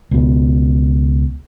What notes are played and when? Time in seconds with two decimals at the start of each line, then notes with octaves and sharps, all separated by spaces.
0.11 C#2 B2